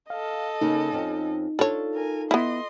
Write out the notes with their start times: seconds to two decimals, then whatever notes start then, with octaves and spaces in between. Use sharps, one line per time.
0.10 A4 D#5 F5
0.61 C#3 A#3 D#4
0.92 F2 C4 C#4
1.59 D4 F4 A4 C#5
1.94 A#4 G#5
2.31 B3 E4 D#5 C6